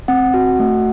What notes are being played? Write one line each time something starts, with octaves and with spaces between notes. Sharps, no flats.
C4 F#5
F#4
A3